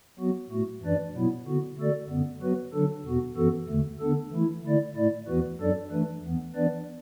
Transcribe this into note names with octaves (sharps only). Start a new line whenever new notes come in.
F#3 B3 F#4
A2 A3 F#4
F#2 E3 D4 B4 D5
B2 F#3 B3 E4
D3 B3 F#4
D3 A3 F#4 A4 D5
F#2 D3 B3
F#3 B3 F#4 B4
D3 F#3 D4 A4
E2 B2 B3 F#4
F#2 E3 B3 F#4 A4
E2 D3 A3
D3 B3 D4 A4
E3 A3 E4
D3 A3 E4 D5
A2 A3 E4 D5
E2 E3 B3 F#4 B4
F#2 F#3 D4 A4 D5
E3 A3 D4 B4
E2 E3 B3
E3 B3 D4 B4 D5